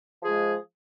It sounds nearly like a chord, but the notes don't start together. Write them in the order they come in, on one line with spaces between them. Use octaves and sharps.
F3 G#4 G#3